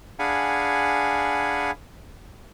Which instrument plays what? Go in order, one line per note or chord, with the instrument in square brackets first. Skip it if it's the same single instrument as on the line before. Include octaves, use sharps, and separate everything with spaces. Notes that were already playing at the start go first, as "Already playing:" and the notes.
[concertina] D4 G#4 F5 F#5 G#5 B5